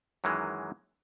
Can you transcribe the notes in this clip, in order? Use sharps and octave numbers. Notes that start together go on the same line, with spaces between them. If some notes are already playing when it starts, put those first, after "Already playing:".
F#2 D#3 E3 F#3 G#3